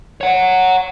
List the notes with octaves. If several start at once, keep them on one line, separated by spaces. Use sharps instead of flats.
C#5 F#5